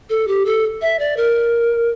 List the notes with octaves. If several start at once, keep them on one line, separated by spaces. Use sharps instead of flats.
A4
G4
A4
E5
D5
A#4